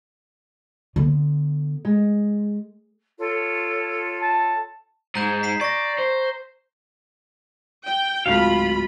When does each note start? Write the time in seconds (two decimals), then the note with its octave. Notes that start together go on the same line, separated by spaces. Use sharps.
0.96 D3 B3
1.85 G#3
3.18 F4 A4 C#5
4.21 A5
5.15 G#2 G#3 A#5 G6 E7
5.43 B6 C7 E7
5.61 D5 C#6 A#6
5.98 C5
7.84 G5
8.26 D1 G#2 A3 F4 F5 B5